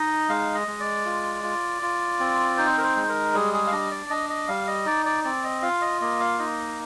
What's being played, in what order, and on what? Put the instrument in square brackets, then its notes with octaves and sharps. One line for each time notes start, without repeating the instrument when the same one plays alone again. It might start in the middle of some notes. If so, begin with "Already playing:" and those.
Already playing: [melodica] D#4 D#5
G#3 F5
D#5
G#3
D5
F4
F4
F4
C4
D#4 C5
A#4
C5
G#3
A#4
G3 G#4
G#4
F5
D4 D#5
D5
D4 D#5
D#5
G3 F5
D#5
D#4 D5
D5
C4 D5
D#5
F4 F5
D#5
A#3 D#5
F5
D#4 D#5